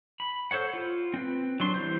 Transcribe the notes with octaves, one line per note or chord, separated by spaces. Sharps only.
B5
A4 C5 C#5 F#5
F4
C4 B4
F#3 D4 C6
E3 G3 C5